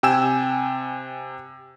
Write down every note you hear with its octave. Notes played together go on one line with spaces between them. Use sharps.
C3 G5 G#5 E6 E7